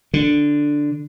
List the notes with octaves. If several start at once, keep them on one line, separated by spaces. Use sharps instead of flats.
D3